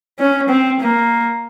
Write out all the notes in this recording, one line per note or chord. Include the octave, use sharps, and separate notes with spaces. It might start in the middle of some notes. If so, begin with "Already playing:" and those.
C#4
C4
A#3